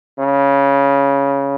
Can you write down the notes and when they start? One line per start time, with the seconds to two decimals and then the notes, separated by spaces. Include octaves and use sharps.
0.19 C#3